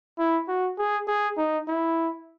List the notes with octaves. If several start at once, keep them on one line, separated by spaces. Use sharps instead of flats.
E4
F#4
G#4
G#4
D#4
E4